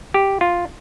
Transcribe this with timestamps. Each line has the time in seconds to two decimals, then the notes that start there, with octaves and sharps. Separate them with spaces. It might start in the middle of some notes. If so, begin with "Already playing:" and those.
0.14 G4
0.41 F4